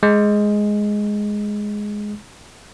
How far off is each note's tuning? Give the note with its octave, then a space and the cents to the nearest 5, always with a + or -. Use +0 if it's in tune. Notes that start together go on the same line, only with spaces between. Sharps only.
G#3 +5